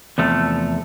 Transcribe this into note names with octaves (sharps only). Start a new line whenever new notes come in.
E2 C3 F3 A3